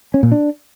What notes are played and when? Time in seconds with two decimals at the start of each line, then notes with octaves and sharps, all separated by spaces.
0.14 C#4
0.23 A#2
0.32 D4